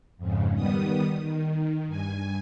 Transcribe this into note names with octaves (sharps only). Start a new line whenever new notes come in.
F2 G#2 C#3
D#3 G3 B3 D#6
D#3
G2 G#5